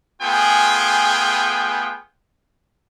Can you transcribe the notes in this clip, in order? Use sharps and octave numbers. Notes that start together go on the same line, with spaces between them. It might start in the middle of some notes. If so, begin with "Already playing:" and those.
A3 B3 F4 G#4 G5 G#5